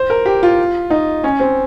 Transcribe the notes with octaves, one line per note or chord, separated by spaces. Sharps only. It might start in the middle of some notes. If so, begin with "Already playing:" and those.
Already playing: C5
A#4
G4
F4
D#4
C#4
C4